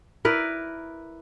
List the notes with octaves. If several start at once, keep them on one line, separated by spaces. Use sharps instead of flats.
E4 A#4 B4 D5